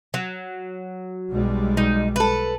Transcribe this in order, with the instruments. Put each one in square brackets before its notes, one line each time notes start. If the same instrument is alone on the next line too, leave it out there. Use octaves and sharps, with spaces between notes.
[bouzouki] F#3
[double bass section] B1 G3 G#3
[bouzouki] D#4
A4 B4